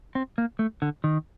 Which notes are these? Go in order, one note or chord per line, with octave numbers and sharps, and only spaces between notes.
C4
A#3
A3
D3
D#3